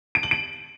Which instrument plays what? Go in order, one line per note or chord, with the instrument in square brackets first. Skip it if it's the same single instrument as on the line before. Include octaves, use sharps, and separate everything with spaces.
[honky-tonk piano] D7
F#7
D7